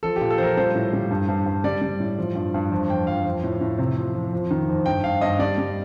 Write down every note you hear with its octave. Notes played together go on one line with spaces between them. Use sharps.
F3 A4
G4
A#2
A4
F3 A#4 C5
G3 C5
A2
G3
G2
G2
G2
G3 D5
G3
A2
F3
G2
G2
F2
F2 G5
F2 F5
F3
A2
A2
C3
F3
F3
F2
D#3
F2
G2 G5
G2 F5
G2 D#5
G3 D5
G3